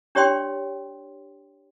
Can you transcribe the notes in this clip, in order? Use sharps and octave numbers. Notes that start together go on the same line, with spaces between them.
D4 G4 C#5 D5 G5 C6